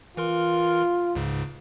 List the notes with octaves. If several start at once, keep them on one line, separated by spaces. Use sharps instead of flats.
E3 F4 A#4 C6
C#2 G#2 C#3